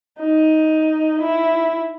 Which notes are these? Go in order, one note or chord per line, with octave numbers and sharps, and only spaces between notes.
D#4
E4